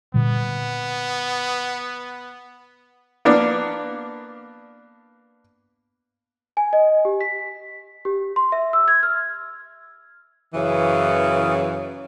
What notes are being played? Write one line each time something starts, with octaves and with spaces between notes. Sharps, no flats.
A#2 D3 G3 B3
A#3 B3 D4
G#5
D#5
G4
B6
G4
C6
E5
E6
G#6
F6
F#2 C#3 E3